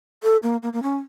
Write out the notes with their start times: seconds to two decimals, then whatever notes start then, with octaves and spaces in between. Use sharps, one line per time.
0.23 A4
0.43 A#3
0.63 A#3
0.73 A#3
0.83 C#4